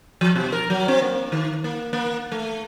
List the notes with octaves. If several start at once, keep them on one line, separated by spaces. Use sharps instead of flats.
F3
B2
A#4
F#3
C4
A#3
D#3
A#3
A#3
A3